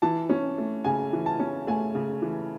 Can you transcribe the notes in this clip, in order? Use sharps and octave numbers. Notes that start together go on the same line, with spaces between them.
E3 A5
C#4
A3
C#3 G#5
E3
A5
C#4
A3 G#5
C#3
E3